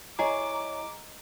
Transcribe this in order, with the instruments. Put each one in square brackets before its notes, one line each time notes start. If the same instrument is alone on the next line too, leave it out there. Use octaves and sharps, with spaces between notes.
[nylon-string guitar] E4 C#5 [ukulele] G#4 [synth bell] D#5 A#5 [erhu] D6